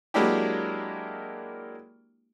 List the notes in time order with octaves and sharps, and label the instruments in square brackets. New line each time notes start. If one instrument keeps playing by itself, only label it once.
[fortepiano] F#3 G#3 A#3 D4 E4 G4